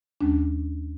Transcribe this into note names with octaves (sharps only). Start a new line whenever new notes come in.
D#2 G#3 C#4 D4